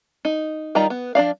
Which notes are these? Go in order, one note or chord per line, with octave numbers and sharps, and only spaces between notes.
D#4
D#3 G3 D#4 F4 A#5
B3
F3 D4 D5 F5